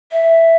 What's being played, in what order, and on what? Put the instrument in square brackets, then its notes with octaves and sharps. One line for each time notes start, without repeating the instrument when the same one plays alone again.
[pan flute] E5